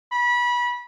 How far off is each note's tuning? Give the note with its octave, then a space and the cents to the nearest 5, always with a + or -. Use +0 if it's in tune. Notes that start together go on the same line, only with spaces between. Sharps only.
B5 -25